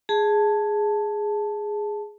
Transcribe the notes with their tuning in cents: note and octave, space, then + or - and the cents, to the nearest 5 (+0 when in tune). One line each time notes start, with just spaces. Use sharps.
G#4 +0 A5 +0